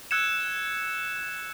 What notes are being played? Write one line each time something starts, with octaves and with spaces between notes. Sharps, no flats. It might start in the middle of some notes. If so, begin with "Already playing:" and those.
E6 F#6 G#6 C#7 E7